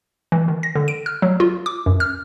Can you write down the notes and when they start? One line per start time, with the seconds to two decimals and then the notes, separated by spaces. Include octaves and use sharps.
0.32 E3
0.48 D#3
0.63 A#6
0.76 D3
0.88 D7
1.06 F6
1.22 F#3
1.40 F4
1.66 D6
1.86 F#2
2.00 F6